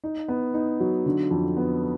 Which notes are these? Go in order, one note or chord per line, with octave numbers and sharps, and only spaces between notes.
D#4
B3
D#4
F#3
D3
F2
B3